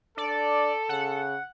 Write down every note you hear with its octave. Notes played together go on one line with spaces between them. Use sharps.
D4 A4 D5
C#3 F#5